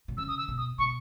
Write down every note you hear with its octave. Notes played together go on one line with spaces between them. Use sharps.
B2
C#3 E6
D#6
E6
B2
D#6
B2 C#6